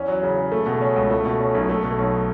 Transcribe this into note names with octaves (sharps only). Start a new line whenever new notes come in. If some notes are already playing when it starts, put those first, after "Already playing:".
Already playing: E2 C#4
F#3
C#3
C#3
A3
B2
C#4
C#2
A3
B2
C#4
B1
A3
B2
B1